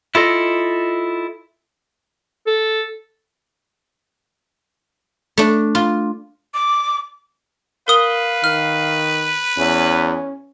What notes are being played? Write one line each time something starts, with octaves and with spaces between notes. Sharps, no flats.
E4 F4 A4 D#5
A4
A3 D4
F4
D6
A#4 B4 F5 D#6 G7
D#3 F6
E2 C#4